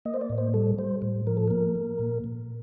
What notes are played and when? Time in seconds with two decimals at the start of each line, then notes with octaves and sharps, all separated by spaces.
0.05 A#3 D#5
0.14 C5
0.21 D5
0.30 A2
0.38 C5
0.54 G3 A4
0.78 G3 C5
1.02 A2
1.27 F3 A#4
1.37 A4
1.48 A#3 A#4
1.75 A#3
1.99 A#2
2.24 A#2